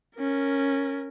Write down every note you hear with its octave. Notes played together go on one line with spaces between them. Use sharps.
C#4 A#4